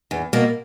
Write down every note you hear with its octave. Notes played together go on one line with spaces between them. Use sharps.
E2
B2 A#3